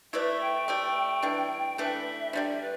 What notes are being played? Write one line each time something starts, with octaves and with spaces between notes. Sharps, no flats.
A3 E4 B4 D5 E5
G5
A3 G4 D5
E3 G3 D4
E3 A3 D4 B4 E5
D3 G3 D4 D5
B4